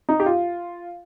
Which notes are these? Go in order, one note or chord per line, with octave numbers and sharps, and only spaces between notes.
D#4
G4
F4